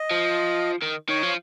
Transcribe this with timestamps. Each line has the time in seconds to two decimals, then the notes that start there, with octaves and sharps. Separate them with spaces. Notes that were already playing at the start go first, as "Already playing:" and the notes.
Already playing: D#5
0.11 F3
0.82 D#3
1.09 D#3 C#5
1.23 F3